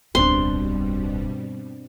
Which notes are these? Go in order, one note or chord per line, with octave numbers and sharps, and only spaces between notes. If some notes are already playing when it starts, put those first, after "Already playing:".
D1 B1 G2 B2 G3 C4 D4 C6